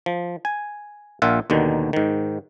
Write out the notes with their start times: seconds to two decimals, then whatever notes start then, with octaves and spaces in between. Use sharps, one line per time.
0.06 F3
0.45 G#5
1.22 A#1 A#2 F4 E5 F#5
1.50 D#2 B2 D3 D#3
1.93 G#2 D#3